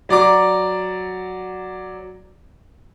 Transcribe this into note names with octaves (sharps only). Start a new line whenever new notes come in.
F#3 D5 A#5 D6